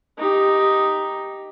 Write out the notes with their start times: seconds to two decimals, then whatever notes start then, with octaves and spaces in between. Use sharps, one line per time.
0.18 D#4 G4